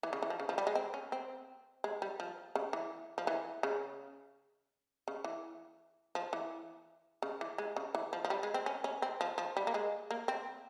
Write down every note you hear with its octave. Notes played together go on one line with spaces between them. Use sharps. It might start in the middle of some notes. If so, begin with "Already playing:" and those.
E3
C#3
E3
F3
C#3
F3
G3
G#3
C4
C#4
C4
G#3
G3
F3
C#3
E3
F3
E3
C#3
C#3
E3
F3
E3
C#3
E3
G#3
C#3
E3
F3
F3
G3
G#3
C4
C#4
C#4
C4
F3
F3
G3
A#3
G#3
A#3
C4